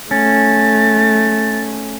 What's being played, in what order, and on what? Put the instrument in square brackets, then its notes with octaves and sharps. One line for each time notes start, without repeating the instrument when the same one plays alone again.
[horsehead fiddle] A3 [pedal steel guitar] C#4 [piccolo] A6